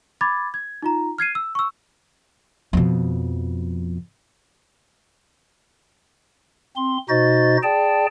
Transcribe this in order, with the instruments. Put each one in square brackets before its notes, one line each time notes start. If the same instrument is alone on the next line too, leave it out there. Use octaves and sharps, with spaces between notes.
[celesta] B5 D6 G#6 A6
G#6
D#4 F4 A#5
F6 G#6 C7 D#7
E6
C#6 E6
[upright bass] F2 B2
[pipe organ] C4 C6
B2 D#4 F#4 C5 D#5 A6
G#4 D5 G5 A5